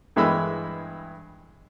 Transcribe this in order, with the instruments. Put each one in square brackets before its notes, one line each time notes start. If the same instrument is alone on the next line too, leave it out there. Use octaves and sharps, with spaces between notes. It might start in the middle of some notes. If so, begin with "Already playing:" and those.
[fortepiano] G2 E3 G#3 E5 B5 E6